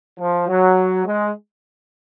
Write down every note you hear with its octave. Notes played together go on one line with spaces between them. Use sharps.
F3
F#3
G#3